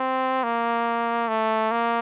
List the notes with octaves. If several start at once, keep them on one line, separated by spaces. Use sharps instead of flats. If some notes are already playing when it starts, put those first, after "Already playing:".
Already playing: C4
A#3
A3
A#3